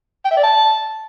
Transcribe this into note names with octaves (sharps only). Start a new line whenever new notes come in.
G5
E5
D5
A5